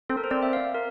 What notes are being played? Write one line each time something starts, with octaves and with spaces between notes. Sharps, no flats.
C4 A4
A#4
C5
C4 D5
E5
F5
A#4